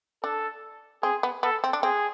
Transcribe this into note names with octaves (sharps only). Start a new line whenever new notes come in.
D4 A4
C4 G#4
B3
B3 A4
C4
D4
C4 G#4